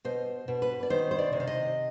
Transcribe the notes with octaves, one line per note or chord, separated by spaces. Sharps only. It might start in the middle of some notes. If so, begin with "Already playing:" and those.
B2 C5
B2
B4
D5
D#3 C5
C5
D5
C3
F5
D#5